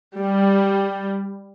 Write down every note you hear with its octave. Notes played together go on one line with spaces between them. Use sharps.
G3